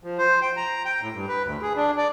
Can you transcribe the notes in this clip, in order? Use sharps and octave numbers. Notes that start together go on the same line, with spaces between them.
F3
C5
G5
A#5
G5
A2
G2
B4
D2
G#4
D4
D5